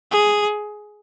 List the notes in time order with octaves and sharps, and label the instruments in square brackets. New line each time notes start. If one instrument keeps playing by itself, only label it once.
[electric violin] G#4